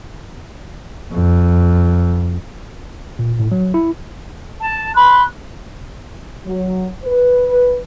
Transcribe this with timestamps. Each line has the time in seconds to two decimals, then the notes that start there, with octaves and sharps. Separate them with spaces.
1.13 F2
3.19 A#2
3.40 A2
3.52 F#3
3.74 E4
4.60 A5
4.95 B5 C6 F#6
6.46 F#3
7.04 B4